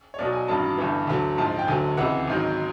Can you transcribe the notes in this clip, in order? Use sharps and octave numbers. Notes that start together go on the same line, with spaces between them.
C#5
B1 B2 F#3 D5
G#5
A1 G2 D#3 F#3 A5
G1 G2 E3
D2 D3 F#3
A#1 G#2 F3 A5
G5
D2 D3 F#3 G#5
C#2 C3 E3 F#5
G#1 G#2 D#3 F#3